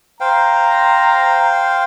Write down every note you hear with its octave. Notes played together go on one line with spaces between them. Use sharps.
C5 F5 G5 A#5